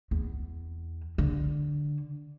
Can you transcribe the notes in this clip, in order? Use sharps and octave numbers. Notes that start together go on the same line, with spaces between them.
E2
D3